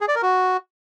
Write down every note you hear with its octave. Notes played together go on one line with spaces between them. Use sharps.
G#4
D5
A#4
F#4